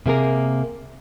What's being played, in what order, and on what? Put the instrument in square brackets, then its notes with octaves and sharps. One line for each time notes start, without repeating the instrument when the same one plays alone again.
[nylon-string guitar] C3 A#3 G#4 A#4